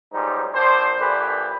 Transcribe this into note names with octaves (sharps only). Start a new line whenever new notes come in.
B1 G#2 F3 G3 D#4
A#1 D4 C5
A#1 D3 E3 G4 B4